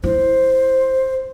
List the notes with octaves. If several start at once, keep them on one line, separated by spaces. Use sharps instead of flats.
E4 C5